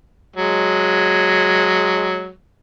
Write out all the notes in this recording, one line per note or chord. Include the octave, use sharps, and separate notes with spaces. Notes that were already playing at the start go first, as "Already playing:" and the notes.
F#3 G#3